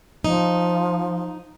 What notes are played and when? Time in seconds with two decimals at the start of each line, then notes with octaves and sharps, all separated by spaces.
0.24 F3 D#4